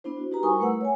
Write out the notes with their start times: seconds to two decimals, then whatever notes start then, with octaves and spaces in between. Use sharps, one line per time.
0.04 B3 D4 E4 C5
0.17 F#4
0.31 D#4 F#4 G4 B4 C5 A#5
0.43 G3 E4 A#4 G#5 C#6 D#6
0.60 A3 B4 F#5 E6
0.81 C#5 G#5